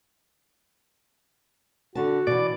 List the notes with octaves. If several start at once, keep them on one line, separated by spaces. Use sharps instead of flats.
D3 F#4 A5
B2 E3 D5